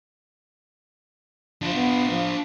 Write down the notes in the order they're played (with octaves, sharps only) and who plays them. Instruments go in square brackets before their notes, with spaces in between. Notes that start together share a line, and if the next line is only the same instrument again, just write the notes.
[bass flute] F3 [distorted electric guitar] D4 F4
[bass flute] B3
F3